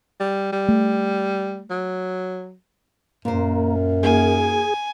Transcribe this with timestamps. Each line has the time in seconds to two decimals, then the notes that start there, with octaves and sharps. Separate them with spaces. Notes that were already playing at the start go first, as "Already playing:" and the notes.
0.20 G3
0.53 G3
0.68 A3
1.71 F#3
3.25 F#2 A#2 A#3 C5
4.03 A#3 D#4 F#4 G#4 G#5